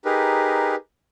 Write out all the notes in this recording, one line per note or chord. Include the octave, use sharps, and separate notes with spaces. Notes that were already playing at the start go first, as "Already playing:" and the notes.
D#4 G4 G#4 A#4 B4